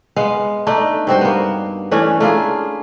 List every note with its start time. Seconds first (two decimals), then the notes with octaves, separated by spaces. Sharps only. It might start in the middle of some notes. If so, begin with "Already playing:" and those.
0.16 G#3 B3 F5
0.67 A3 D4 D#4
1.07 G2 C4 F#4 C5
1.21 A#3 B3
1.91 E3 A3 C#4 D4
2.20 A3 A#3 F4 G#4